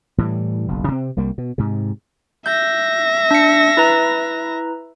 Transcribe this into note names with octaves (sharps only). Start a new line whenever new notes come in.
A2 E3 F3 G3
F#1 B1
C3 B3 C4
C2 G3 A#3
B2
G#2 C3
E5 G6 A#6
D4 C#7
E4 B4 A#5